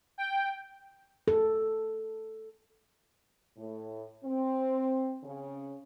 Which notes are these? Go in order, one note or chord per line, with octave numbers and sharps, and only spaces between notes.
G5
A4
A2
C4
C#3